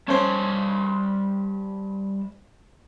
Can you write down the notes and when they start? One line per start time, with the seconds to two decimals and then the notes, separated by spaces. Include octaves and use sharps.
0.08 G3 C#4 C5 E5 A5